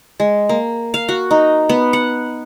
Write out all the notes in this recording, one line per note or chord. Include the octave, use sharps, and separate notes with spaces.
G#3
A#3
F5
F#4
D#4
B3
F#5